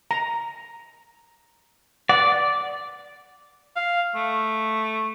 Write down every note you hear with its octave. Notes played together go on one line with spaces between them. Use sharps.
A#5
D5 F#5
F5
A3